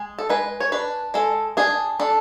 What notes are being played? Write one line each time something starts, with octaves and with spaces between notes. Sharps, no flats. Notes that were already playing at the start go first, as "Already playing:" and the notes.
Already playing: G#3
A4
G#3 B4
C#5
D4 B4
G#3 A4
D4 G#4
D4 A4